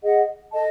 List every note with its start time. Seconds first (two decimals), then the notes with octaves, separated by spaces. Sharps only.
0.03 G#4 D#5 F#5
0.52 A4 D#5 A5